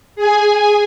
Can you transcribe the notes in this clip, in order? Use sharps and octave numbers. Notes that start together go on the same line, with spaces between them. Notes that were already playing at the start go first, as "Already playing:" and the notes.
G#4 G#5